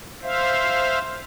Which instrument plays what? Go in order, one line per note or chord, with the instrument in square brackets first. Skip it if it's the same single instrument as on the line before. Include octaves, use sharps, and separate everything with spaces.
[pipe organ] C5 E5 F5